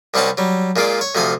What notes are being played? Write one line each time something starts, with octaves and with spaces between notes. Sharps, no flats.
C2 G3 C4 C#4 F#5 A5
F#3 G3
A#2 G#3 F4 D5 D6
C#5
D2 C3 F3 A4 G#5 D#6